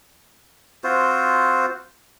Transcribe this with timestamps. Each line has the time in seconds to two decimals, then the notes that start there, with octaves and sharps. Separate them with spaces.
0.84 C4 F4 F#4 C5